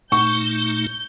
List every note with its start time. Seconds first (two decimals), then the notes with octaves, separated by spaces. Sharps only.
0.12 A#2 A3 D#4 C#6 G6